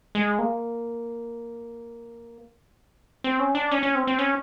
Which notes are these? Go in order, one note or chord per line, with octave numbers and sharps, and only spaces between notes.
G#3
A#3
C4
C#4
D4
C#4
C#4
C4
C4
C#4